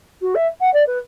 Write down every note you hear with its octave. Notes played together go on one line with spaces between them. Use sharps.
F#4
E5
F#5
D5
B4